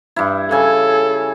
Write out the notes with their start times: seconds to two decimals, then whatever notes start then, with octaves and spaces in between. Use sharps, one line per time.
0.16 G2 E4
0.51 C#3 A4 G#5